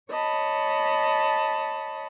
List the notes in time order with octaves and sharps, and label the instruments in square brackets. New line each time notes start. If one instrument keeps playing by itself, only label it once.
[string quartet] C#5 D#5 A5 B5